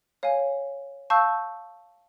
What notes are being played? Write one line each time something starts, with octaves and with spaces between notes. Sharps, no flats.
C#5 F5 G#5
F5 A5 C#6 E6 G6